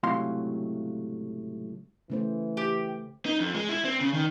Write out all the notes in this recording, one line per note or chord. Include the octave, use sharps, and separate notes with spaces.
C#2 A2 C3 F#3 F5 C6
C#3 E3 A3 C5
G4
D#4
F2
G#3
E4
C4
C#3
D#3